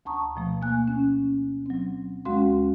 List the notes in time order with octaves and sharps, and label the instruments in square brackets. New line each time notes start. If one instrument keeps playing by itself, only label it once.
[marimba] D2 A5 A#5 C#6 D#6
B2 F3 A3
A#3 G#5 F#6
C#4
F#3 C4
D2 G#3 C#4 F#4 F5 C6